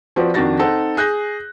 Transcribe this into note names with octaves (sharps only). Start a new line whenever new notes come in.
F3 C4 F#4 B4 D5
F2 D#3 D4 F#4 A6 A#6
C4 D#4 A4 F#5
G#4 F#6 G6 A#6